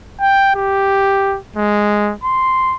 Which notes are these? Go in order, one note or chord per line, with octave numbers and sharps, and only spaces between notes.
G5
G4
G#3
C6